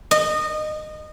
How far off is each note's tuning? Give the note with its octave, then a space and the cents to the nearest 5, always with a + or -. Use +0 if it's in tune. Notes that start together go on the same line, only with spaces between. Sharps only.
D#5 -20